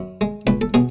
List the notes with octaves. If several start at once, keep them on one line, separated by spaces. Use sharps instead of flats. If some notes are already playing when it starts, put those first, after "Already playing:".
Already playing: F#2
G#3
C#2 B4
A4
B2 G#4